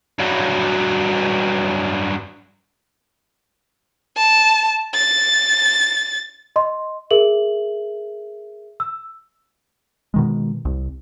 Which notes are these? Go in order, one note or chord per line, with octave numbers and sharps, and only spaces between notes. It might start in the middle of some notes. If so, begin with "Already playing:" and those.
G2 F#3
A5
A6
D#5 C6
G#4 A#4 E5 F#7
E6
B2 D#3 G#3
C2